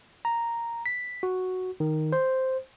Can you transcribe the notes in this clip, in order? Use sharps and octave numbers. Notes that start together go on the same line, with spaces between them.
A#5
B6
F#4
D#3
C5